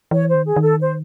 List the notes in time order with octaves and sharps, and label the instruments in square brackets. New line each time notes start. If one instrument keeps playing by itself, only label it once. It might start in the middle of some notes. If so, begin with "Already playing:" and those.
[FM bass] E3 [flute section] C#5
[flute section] C5
[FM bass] D#3
[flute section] G#4
[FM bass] D#3
[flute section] A4
C5